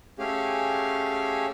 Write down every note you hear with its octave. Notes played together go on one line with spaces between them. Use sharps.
A3 C#4 G4 G#4 F5